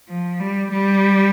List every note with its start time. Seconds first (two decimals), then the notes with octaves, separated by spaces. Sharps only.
0.09 F3
0.40 G3
0.72 G3